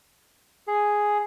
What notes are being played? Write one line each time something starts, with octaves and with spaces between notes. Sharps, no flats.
G#4